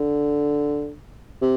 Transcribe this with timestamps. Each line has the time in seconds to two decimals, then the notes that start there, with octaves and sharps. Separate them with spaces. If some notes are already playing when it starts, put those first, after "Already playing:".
Already playing: D3
1.42 C3